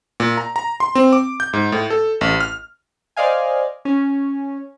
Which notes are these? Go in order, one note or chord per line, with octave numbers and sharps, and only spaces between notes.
A#2
A#5
A#5
C6
C4
D6
G6
G#2
A2
A4
A1
F6
C5 D5 D#5 F5 G#5
C#4